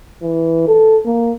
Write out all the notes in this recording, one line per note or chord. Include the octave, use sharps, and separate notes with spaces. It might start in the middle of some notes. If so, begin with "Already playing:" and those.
E3
A4
A#3